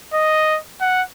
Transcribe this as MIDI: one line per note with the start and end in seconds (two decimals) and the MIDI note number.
0.14 0.58 75
0.81 1.02 78